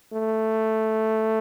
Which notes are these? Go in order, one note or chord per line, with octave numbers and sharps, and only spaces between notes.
A3